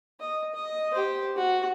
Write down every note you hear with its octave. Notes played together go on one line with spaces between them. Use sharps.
D#5
D#5
G4 C5
F#4